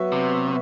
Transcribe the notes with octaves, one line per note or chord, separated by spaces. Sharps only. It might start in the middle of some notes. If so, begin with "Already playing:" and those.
Already playing: F#3 B3 F#4 B4 E5
C3